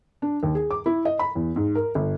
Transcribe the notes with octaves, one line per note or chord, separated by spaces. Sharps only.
D4
D#2
G#4
D6
E4
D#5
B5
E2
G#2
A#4
G1